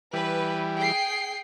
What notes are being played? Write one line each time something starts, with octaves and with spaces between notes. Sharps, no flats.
E3 G3 B4
G#4 G5 C7